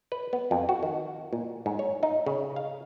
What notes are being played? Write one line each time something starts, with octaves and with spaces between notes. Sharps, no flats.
B4
B3
F2
F#4
D#3
A#2
G#2
C#5
D#4
C#3
F5